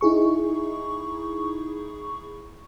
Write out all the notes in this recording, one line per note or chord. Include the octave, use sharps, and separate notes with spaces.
D#4 E4 G#4 C#6